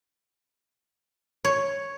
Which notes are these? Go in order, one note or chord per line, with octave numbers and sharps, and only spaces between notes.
C#5